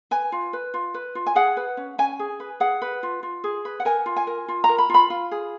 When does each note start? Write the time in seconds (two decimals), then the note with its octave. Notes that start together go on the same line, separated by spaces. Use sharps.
0.11 B4 G#5
0.32 F4
0.53 B4
0.74 F4
0.94 B4
1.15 F4
1.26 G#5
1.35 G#4 F#5
1.57 B4
1.77 C#4
1.98 C#4 G#5
2.19 G#4
2.40 B4
2.60 G#4 F#5
2.82 B4
3.03 F4
3.23 F4
3.44 G#4
3.65 B4
3.80 F#5
3.85 A#4 G#5
4.06 F4
4.16 G#5
4.27 A#4
4.48 F4
4.64 A#5
4.69 A#4
4.78 B5
4.90 F4 B5
5.10 F4
5.31 G#4